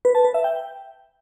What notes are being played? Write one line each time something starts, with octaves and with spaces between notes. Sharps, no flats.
B4
A5
B4
E5
G5